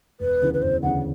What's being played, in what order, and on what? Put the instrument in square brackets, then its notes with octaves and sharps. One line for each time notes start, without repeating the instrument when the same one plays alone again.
[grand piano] E1 [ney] B4
[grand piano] D2 C#3 E3
[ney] B4
[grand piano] E1 [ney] C5
[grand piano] D2 C#3 E3 [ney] F#5